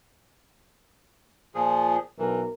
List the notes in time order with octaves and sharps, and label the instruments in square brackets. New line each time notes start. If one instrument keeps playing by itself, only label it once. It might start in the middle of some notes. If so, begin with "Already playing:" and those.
[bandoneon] A#2 F3 G#4
[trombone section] B1 A#4 [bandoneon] E3